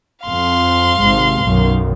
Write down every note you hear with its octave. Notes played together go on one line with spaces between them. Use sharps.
F2 F5 C6
G#1 G#2 C3
B1 F#2 D#3